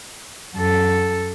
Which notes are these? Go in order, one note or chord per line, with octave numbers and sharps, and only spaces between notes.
F#2 A4